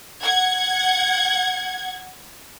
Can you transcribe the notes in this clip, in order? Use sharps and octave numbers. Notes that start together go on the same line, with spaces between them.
F#5 G#6